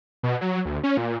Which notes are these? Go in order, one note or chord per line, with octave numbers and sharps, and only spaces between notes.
B2
F#3
D2
C#4
A#2